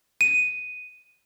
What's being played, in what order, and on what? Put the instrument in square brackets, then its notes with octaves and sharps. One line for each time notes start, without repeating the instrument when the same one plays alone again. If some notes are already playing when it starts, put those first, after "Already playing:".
[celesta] D#7